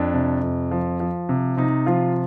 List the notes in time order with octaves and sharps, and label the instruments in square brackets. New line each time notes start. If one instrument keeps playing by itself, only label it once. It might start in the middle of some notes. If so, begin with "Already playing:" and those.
Already playing: [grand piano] F2 D4
C3
F2
F3
F3
C3
C3 D#4
F3 F4